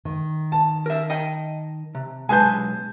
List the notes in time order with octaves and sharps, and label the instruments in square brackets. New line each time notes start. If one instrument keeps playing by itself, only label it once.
[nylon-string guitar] D#3
[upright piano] A5
[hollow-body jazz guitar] A#4 E5
D#5 G5
C3
[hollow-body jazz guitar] B1 G#3 B4 [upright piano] G#5 A5 G6